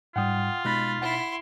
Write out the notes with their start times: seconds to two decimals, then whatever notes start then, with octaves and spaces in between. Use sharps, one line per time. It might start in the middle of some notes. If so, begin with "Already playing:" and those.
0.16 G#2 G3 F4 F#5 G5 D#6
0.65 B2 G#3 D#4 B5 F#6 A6 A#6
1.02 E4 F#5 C6